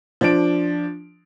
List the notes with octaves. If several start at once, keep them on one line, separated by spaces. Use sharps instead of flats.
F3 D4 D7